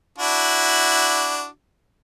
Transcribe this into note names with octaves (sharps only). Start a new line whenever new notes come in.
D4 E4 F#4